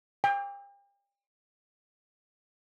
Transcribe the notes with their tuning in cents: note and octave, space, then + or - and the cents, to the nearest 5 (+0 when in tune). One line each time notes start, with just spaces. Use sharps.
G5 +40